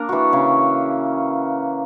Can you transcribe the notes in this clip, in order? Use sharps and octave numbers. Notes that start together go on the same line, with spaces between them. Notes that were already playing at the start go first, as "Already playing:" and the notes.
Already playing: A#3 D4 A#4
E3 E4 F#4
C#3 C#4